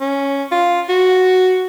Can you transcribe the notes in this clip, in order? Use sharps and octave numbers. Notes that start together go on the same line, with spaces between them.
C#4
F4
F#4